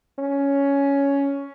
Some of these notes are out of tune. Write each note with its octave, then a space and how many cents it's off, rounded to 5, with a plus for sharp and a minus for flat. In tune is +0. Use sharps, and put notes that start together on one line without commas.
C#4 +10